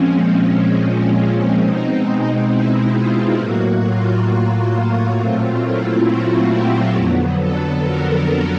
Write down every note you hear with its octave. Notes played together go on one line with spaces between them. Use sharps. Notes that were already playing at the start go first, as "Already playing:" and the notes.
Already playing: A#2 F3 G#3 C4 C#4
C#4
B2 G#3 C4 D#4
E4
F4
A2 F#3 A#3 F#4
F4
A#2 F#3 A3 C4 F4
E4
F#4
G4
F2 D3 F#3 B3
A4
A#4
A#4